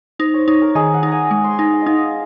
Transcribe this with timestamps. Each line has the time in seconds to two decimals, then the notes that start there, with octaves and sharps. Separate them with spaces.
0.19 D#4 C5
0.34 C#5
0.47 D#4 C#5
0.62 A#4
0.75 D#3 G#4
0.94 F#5
1.03 D#4 A#5
1.12 G#5
1.31 G#3
1.44 C6
1.59 D#4 G#5
1.73 F#5
1.82 D#4 D#5 F5